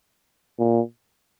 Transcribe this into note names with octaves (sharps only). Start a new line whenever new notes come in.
A#2